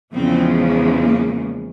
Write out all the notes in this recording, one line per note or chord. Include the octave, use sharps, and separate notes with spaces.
E2 C#3 F3 G#3 C4
A#3